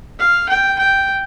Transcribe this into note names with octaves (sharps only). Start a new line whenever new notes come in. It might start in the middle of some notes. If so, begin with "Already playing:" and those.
F5
G5
G5